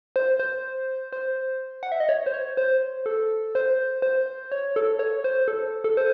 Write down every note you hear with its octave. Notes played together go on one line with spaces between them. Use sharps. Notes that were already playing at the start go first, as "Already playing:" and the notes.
C5
C5
C5
F#5
E5
D#5
C#5
C5
C#5
C5
A4
C5
C5
C#5
A4
C#5
C5
A4
A4
C5